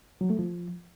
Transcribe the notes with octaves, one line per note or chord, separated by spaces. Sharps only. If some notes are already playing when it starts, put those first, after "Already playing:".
F#3
A3
F3